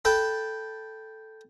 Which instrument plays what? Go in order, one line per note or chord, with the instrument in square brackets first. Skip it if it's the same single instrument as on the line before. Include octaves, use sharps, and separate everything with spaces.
[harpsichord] A4 B4 G5 A5